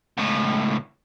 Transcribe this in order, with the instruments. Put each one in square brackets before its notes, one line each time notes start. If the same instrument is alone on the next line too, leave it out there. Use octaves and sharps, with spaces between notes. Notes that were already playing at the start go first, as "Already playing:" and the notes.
[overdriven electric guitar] C#2 A2